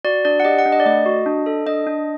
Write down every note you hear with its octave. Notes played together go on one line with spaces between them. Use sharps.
F#4 D5
D4 D5
F#5
G4 D#5
F#5
D4
D#5
D5
A3 D#5
F#4
D4
A4
D4 D#5
D4